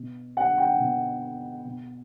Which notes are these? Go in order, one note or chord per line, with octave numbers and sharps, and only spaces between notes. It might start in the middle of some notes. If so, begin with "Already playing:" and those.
Already playing: B2
F#5
G5
B2
B2